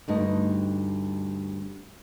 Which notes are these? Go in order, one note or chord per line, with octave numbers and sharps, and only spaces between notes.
D2 G2 D#4 D#5